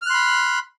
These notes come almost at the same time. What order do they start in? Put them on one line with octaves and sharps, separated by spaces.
F6 F#6 C6 B5